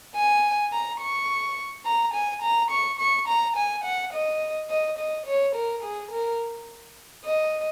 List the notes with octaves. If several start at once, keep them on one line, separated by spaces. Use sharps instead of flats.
G#5
A#5
C#6
A#5
G#5
A#5
C#6
C#6
A#5
G#5
F#5
D#5
D#5
D#5
C#5
A#4
G#4
A#4
D#5